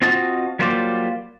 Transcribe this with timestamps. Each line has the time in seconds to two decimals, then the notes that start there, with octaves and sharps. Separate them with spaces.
0.02 C4 F4 F#4 D#5 A5
0.59 F#3 G3 A#3 F4 C5 D5